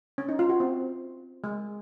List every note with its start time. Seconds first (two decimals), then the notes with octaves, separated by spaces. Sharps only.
0.18 C#4
0.29 D#4
0.39 F4
0.49 F#4
0.60 C4
1.44 G#3